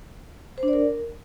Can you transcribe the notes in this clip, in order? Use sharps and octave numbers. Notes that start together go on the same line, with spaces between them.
C5
D4
D5
A#4